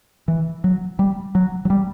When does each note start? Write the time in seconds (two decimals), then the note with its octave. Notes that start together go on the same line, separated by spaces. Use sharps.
0.28 E3
0.64 F#3
0.99 G3
1.35 F#3
1.65 F#3
1.70 G3